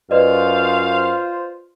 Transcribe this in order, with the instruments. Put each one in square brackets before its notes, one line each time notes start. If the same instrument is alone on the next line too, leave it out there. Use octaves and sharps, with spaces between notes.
[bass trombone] F#2 [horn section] F4 C5 [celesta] B4 D5 D#5 [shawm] F5